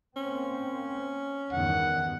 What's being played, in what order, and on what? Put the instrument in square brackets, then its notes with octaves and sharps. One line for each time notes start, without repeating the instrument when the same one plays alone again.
[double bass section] A#3 C4 [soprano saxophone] C#4
[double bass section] E2 G2 D#3 [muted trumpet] F#5